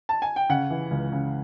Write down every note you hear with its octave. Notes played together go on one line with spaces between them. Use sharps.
A5
G#5
G5
C#3 F#5
E3
C#2
C#3